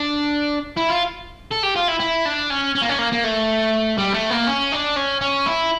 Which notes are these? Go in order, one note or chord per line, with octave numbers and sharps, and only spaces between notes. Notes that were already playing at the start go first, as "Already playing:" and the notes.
Already playing: D4
E4
F4
A4
G4
F4
E4
E4
D4
C#4
C#4
A#3
C#4
A#3
A#3
A3
G3
A3
A#3
C#4
D4
C#4
C#4
E4